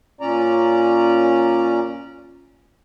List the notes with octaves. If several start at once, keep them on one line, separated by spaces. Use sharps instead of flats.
A#2 C#4 D5 A#5